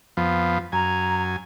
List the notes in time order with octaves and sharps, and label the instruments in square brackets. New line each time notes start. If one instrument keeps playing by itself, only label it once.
[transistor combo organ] F2 F3 B3
[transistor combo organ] F#2 G#5 [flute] A#5